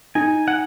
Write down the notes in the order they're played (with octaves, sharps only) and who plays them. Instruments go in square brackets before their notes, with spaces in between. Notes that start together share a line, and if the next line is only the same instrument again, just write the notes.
[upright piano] D#4 [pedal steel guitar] G#5
[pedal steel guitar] F#5